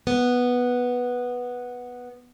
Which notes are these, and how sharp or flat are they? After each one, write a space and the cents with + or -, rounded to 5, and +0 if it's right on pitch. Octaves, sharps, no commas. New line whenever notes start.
B3 -5